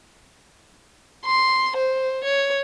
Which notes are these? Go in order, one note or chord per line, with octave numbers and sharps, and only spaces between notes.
C6
C5
C#5